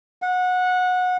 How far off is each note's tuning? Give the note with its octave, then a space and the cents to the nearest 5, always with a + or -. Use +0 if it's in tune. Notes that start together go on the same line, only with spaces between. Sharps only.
F#5 -20